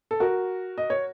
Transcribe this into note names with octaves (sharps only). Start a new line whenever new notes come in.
A4
F#4 A#4
D#5
C#5